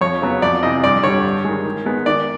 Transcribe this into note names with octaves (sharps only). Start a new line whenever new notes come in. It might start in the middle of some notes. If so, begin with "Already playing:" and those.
F2 C#5
C#3 F#3 B3
F2 D5
C3 E3 D#5
G2 D5
D3 G3 C#5
G2
D#3 G#3
D#3
G#3 B3
D#3 D5